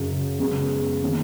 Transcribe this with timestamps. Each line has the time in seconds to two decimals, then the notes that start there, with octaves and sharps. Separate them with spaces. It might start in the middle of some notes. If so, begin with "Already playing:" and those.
Already playing: F#2 C#3 F#3
0.39 F#2 C#3 G#3 B3
1.02 D#3 A#3 C#4